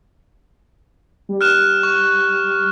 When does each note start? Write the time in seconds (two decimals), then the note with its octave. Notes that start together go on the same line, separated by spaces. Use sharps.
1.29 G3
1.41 F6 F#6 E7
1.83 C#6